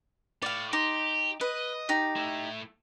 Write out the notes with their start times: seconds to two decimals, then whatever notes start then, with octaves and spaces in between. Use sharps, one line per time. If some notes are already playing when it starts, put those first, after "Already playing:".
0.42 A2 D5 F5
0.73 D#4 G4 C6 D6
1.41 B4 D#5
1.89 D#4 G4
2.16 A3 E4